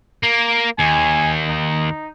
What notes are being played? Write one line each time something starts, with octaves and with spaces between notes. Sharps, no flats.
A#3
D#2 G#5
D#4